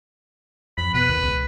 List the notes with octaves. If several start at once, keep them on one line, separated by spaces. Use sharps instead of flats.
F2 B5
B2 B4
D#2
C#2